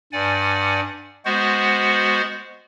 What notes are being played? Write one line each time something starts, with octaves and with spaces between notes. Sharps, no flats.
G2 D5 F#5 G#5
G#3 B3 F#4 C5 F#5